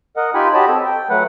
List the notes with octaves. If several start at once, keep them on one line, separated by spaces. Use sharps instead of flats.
A#4 D#5 F#5
D#4 F4 G4 G5 G#5 B5
F#4 G4 C#5 D#5 A5 B5
C4 A4
G5
F#3 A3 B4 F#5